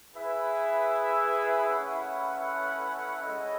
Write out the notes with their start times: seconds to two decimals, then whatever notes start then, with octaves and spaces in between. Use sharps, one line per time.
0.13 E4 G#4 B4 E5
1.68 A3 C#4 E4 B4 F#5
3.23 G#3 C#4 E4 A4 D#5